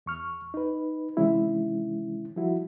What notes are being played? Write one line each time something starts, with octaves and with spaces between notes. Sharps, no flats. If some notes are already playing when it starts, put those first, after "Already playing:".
E2 C#6 F6
D#4 B4
C3 D#3 E3 G#3 C#4 E4
F3 G3 E4 F#4